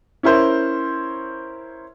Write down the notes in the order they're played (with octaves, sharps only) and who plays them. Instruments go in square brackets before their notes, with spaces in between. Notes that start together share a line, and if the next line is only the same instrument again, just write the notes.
[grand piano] C#4 E4 A#4 C5